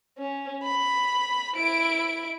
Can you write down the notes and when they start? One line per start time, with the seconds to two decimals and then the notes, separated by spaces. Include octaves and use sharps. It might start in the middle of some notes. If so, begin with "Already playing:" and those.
0.18 C#4
0.63 B5
1.55 E4 D7